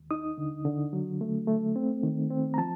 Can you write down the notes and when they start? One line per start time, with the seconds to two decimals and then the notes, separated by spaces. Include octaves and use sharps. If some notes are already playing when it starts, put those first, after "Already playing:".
Already playing: D#2
0.11 D#4 D#6
0.38 D3
0.65 D3
0.93 F#3
1.21 A3
1.48 A3
1.76 C4
2.03 D#3
2.30 C4
2.54 A#5
2.58 F3 A5